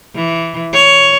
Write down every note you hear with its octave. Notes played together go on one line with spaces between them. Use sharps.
E3
C#5